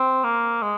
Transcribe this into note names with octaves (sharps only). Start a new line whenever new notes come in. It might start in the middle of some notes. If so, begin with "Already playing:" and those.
Already playing: C4
A#3
G#3